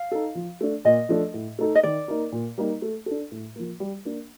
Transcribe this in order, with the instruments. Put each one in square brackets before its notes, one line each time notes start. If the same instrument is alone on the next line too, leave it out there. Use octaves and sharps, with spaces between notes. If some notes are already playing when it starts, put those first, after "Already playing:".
Already playing: [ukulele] F5
[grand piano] D#4 A4
F3
A3 D4
[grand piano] A#2 [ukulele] D#5
[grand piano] F3 A3 D4 A4
A2
A3 D#4 A4
[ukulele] D#5
[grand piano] D#3 [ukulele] D5
[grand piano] A#3 D#4 A#4
A#2
G3 A#3 D#4
A3
D4 A4
A2
F3 A#3
G3
A#3 D4